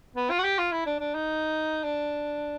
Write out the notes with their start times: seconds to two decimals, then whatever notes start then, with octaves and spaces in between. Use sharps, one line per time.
0.16 B3
0.30 F4
0.39 F#4
0.44 G4
0.58 F4
0.72 E4
0.86 D4
1.00 D4
1.14 D#4
1.84 D4